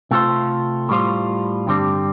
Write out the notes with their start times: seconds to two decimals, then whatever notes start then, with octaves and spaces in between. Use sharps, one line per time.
0.11 C3 A3 F4 A4 C5
0.89 A2 G3 F4 C5
1.67 G2 D3 G3 C4